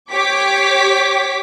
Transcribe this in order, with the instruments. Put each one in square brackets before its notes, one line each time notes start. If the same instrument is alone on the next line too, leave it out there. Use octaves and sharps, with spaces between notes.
[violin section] G4 C#5 D6 B6